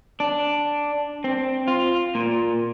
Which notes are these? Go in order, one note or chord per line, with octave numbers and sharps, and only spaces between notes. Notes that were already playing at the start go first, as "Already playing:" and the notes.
D4
C4
F4
A#2